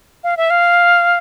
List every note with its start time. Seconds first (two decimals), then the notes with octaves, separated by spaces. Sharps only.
0.24 F5
0.37 E5
0.50 F5